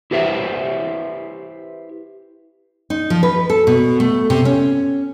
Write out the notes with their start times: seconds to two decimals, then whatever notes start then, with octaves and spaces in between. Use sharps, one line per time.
0.11 E4 G4 B4 C5 E5
2.90 D#4
3.10 F3
3.23 B4
3.50 A4
3.67 B2
4.00 A3
4.30 C3
4.45 C#4